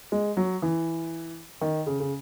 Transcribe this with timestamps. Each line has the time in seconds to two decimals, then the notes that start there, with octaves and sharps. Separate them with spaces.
0.12 G#3
0.37 F#3
0.62 E3
1.61 D#3
1.87 C#3
2.00 C#3